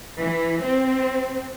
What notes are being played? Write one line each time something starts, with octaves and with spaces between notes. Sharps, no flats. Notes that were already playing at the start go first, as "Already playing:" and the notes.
E3
C4